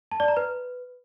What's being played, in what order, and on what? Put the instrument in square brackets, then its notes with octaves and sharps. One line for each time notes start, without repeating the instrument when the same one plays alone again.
[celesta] A5
D5
A#5
B4